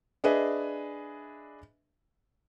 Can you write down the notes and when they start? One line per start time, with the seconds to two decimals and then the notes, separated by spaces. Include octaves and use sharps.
0.24 D4 G#4 B4 D#5 E5